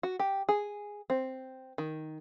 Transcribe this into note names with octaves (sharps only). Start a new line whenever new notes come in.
F#4
G4
G#4
C4
D#3